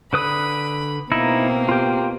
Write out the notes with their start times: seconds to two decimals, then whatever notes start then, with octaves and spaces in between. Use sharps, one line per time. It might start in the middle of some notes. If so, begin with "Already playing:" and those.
0.13 D3 B4 B5 D#6
1.12 B2 A#3 C4 D#4 E4
1.69 F4 G4